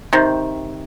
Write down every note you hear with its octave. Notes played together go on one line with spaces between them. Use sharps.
C3 D#3